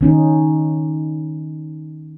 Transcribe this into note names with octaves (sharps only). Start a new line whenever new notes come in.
D#3 C#4 D#4